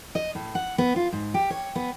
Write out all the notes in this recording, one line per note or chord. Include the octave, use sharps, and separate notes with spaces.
D#5
A2
F#5
B3
F4
G#2
G4
C#5
B3